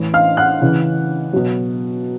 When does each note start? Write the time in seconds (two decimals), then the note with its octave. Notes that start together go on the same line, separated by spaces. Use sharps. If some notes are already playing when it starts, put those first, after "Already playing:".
Already playing: A2 E3
0.14 F5 F6
0.37 F#5 F#6
0.62 C#3 E3
1.33 B2 F#3